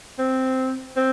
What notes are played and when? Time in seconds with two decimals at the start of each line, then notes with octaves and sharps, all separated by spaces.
0.19 C4
0.97 C4